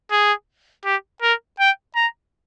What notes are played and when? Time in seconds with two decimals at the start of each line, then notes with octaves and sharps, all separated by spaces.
0.11 G#4
0.85 G4
1.22 A#4
1.59 G5
1.95 A#5